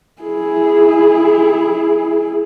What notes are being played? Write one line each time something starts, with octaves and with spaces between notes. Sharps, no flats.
E4 G#4